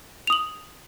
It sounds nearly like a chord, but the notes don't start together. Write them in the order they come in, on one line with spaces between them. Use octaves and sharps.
F7 D#6 F#7